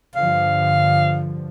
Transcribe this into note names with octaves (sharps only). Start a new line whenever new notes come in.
G2 D3 F3 F5